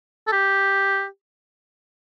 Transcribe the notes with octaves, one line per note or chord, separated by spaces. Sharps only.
A4
G4